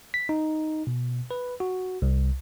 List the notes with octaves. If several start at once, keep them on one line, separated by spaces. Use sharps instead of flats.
B6
D#4
B2
B4
F#4
C2